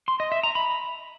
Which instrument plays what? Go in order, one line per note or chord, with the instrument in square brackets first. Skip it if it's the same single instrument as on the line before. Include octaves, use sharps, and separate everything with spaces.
[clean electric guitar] C6
D#5
E5
A#5
B5